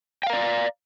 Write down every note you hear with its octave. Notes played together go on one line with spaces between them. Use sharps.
D5 F5 G5 A#5